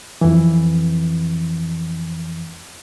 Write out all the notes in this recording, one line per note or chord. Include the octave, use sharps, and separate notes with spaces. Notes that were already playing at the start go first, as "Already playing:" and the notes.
F2 E3